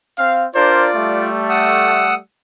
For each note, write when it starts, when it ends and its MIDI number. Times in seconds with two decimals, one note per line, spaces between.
0.18 0.46 60
0.18 0.46 77
0.55 0.90 62
0.55 1.28 65
0.55 0.90 70
0.55 0.90 72
0.55 1.28 74
0.96 2.19 55
0.96 2.19 57
1.50 2.14 78
1.50 2.14 87
1.50 2.14 88